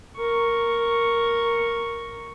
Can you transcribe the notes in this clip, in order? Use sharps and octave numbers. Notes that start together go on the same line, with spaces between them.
A#4 C#6